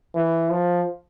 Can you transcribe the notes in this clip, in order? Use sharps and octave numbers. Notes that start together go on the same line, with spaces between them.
E3
F3